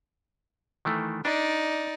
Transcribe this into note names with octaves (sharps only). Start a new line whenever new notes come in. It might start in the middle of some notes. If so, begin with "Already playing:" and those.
D#3 E3 A3
D4 D#4 D5